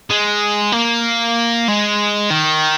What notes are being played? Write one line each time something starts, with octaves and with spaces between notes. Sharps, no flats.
G#3
A#3
G#3
D#3